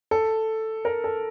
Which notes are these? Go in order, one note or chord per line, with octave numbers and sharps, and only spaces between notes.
A4
A#4
A4